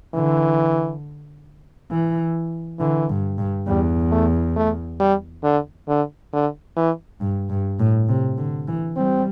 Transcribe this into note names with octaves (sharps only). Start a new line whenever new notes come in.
D3 E3
E3
D3 E3
G2
G2
E2 G3
A3
A3
G3
D3
D3
D3
E3
G2
G2
A2
C3
D3
E3
G3 C4